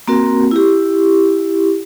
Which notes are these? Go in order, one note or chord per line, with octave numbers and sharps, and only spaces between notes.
A#3 C4 F#4 A#4
E4 G4